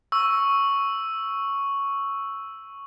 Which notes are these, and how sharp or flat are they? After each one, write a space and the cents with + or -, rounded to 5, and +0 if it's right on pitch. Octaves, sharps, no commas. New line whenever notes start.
C#6 +0 E6 +0